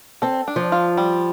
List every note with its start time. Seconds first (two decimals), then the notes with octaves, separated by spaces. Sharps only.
0.22 C4 A4
0.48 D4
0.56 F3
0.72 F4
0.97 G3